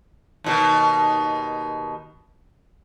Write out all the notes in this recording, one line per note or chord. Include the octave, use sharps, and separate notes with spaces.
D#2 B2 D#3